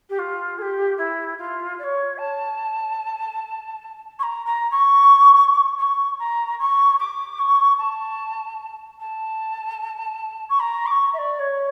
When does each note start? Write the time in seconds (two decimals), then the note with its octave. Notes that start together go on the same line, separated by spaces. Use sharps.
0.09 G4
0.18 F4
0.58 A4
0.61 G4
0.97 E4
1.38 F4
1.78 D5
1.83 C#5
2.17 A5
4.19 C#6
4.23 A#5
4.46 A#5
4.71 C#6
5.78 C#6
6.19 A#5
6.59 C#6
6.99 D6
7.38 C#6
7.78 A5
9.00 A5
10.49 C#6
10.59 A#5
10.86 D6
10.90 C#6
11.13 E5
11.18 D5
11.39 C#5